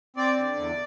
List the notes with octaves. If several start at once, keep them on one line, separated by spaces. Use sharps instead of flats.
C4 D5
D3
E2